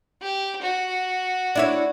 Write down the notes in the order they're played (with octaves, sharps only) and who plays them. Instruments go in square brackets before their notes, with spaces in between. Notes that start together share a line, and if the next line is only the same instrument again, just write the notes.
[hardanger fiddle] G4
F#4
[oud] D4 E4 C#5